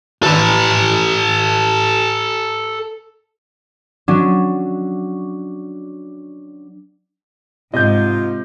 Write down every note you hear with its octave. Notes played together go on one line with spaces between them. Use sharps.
A4 B4
F#3 C#4 D4
G#2 C3 F4 D#5 G6